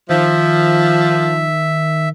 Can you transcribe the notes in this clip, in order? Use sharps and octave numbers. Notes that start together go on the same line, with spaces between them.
D#3 F3 E5